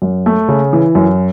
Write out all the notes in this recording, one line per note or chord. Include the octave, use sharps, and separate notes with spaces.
F#2
A3
C#3
E3
F#2